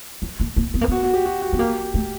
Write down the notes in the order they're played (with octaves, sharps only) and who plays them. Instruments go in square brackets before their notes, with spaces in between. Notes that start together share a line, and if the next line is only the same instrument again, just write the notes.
[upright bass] F#3
A#3
A#3
B3
A#3
[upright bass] B3 [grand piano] F#4
[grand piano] F#4
G4
F#4
F#4
[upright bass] B3
[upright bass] A#3 [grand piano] G4
[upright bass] A3